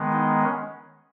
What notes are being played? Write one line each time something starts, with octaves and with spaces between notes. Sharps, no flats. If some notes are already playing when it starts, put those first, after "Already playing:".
Already playing: D#3 G#3 B3
D#4
C#4